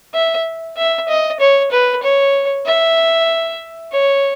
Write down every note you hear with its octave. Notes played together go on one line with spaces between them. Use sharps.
E5
E5
D#5
C#5
B4
C#5
E5
C#5